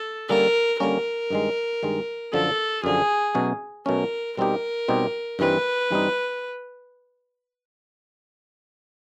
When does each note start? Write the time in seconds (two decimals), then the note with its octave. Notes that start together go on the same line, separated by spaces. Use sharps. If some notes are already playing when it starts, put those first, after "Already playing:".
Already playing: A4
0.29 D3 G3 A#3 C#4 A#4
0.80 D3 G3 A#3 C#4 A#4
1.30 G2 D#3 G#3
1.83 G2 D#3 G#3
2.33 F#2 D3 F3 A4
2.84 F#2 D3 F3 G#4
3.35 B2 F#3 A3 C#4
3.86 B2 F#3 A3 C#4 A#4
4.37 B2 G3 C4 D#4 G4 A#4
4.88 B2 G3 C4 D#4 G4
5.39 G2 E3 G3 C4 D#4 B4
5.91 G2 E3 G3 C4 D#4